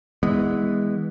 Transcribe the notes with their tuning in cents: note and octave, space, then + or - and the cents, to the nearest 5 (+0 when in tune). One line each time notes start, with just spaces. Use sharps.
E3 -30 G#3 -25 B3 +0